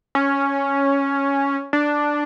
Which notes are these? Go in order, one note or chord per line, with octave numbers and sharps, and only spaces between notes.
C#4
D4